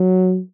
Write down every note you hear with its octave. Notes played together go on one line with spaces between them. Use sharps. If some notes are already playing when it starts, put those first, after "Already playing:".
Already playing: F#3